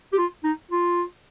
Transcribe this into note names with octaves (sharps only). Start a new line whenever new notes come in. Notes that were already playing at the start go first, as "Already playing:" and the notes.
G4
F4
D#4
F4